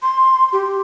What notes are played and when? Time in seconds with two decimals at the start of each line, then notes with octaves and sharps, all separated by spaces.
0.02 C6
0.53 G4